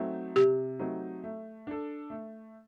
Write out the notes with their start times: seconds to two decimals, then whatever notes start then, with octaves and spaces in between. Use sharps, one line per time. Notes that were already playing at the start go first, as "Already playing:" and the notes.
Already playing: F#3 A3 C4 D#4
0.36 C3 G4
0.79 F#3 A3 C4 D#4
1.24 A3
1.67 D4 A4
2.10 A3